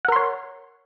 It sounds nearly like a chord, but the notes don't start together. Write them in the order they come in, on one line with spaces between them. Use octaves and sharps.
F#5 A#4 C6 C#5